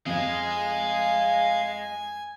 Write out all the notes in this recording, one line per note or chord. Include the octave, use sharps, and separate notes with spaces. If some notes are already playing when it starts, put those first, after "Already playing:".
F2 G#3 G#4 F5 G#5